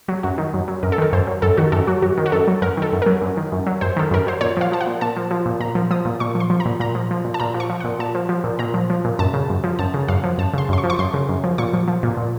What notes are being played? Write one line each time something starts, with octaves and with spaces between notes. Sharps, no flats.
F#3
F#2 F#4
D#3
F#2
F#3
F#2 A#4
A4
D#3 A#4
F#2 C5
F#3
F#2 A4
D#3 F#4
F#2 A4
F#3 F#4
F#2 F#4
D#3
F#4
F#2 A4
F#3
F#2 A#4
D#3 A4
F#2
F#3 A#4
F#2
D#3
F#2
F#3
F#2 C5
D#3 A4
F#2 A#4
F#3 C5
A#2 C#5
F3 F5
F3 A5
F#5
A#2
A#2 A5
F3
F3
A#2
A#2 A#5
F3
F3 D#6
A#2
A#2 C#6
F3
C6
F3
A#5
A#2
A#2 A#5
F3
F3
A#2
A5
A#2 A#5
F3
C#6
F3
F#5
A#2
A#2 A5
F3
F3
A#2
A#2 A#5
F3
F3
A#2
F#2 A5
C#3
F#2
F3
F#2 A5
C#3
F#2 F5
F3
F#2 A5
C#3 C6
F#2 C6
C#6
F3
C#6
F#2 C6
C#3
F#2
F3
A#2 C#6
F3
F3
A#2
A#2